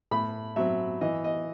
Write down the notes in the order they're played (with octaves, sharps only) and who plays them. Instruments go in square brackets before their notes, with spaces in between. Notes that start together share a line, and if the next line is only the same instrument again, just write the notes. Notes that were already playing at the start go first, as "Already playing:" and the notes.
[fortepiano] A2 B5
F#3 C4 E5
E3 D#5
D#5